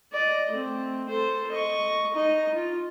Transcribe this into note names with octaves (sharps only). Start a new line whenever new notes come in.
D5 D#5
A3 C4
A4 C5
D#5 C#6
D#4 D#5
F4